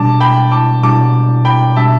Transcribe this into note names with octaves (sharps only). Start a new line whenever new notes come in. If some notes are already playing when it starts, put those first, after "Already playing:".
Already playing: B2 G3 D4 A5 D6
G5 B5
A5 D6
B2 G3 D4 A5 D6
G5 B5
B2 G3 D4 E5 A5